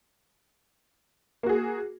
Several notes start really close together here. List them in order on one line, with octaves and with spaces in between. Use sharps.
A#3 F#4 G#4